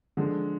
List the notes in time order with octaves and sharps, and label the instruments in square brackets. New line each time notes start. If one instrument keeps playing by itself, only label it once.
[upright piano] D3 F3 G#3